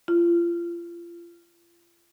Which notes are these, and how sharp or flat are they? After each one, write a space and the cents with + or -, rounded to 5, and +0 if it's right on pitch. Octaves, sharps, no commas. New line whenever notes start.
F4 -35